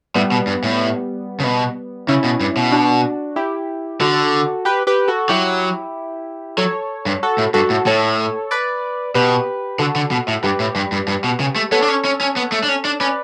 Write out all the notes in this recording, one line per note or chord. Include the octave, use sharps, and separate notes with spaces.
A2 G3 B3
B2
G2
A2
C#3
B2
C#3 C#4 E4
B2
G2
B2
D4 F#4
E4 G4
D3 F#4 A4
G4 B4
G4 B4
F#4 A4
F#3 E4 G4
F#3 A4 C#5
G2
F#4 A4
A2
G2 F#4 A4
A2
A2 A4 C#5
B4 D5
B2 G4 B4
D3 F#4 A4
D3
B2
A2
G2 G4 B4
A2
G2
G2
G2
B2
C#3
A3
B3 A4 C#5
D4
C#4
C#4
C#4
B3
A3
D4
C#4
D4
C#4 B4 D5